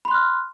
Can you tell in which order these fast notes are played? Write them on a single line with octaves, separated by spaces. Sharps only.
B5 C6 F#6 F6